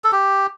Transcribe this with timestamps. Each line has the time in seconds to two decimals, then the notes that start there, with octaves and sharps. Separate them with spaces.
0.04 A4
0.12 G4